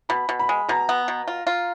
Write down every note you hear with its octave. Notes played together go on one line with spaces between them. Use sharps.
B2 B5
B2
B5
G#3
B2 A#5
B3
B2
F4
F4